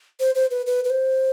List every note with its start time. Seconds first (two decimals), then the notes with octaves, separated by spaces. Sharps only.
0.20 C5
0.35 C5
0.51 B4
0.66 B4
0.84 B4
0.90 C5